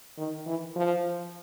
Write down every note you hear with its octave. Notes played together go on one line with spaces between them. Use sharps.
D#3
E3
F3